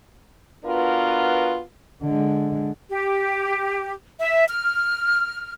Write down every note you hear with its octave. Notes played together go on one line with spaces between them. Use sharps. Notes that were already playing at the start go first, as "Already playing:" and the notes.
B3 D4 F4 F#4 A#4 B4
D3 G#3
G4
E5
F6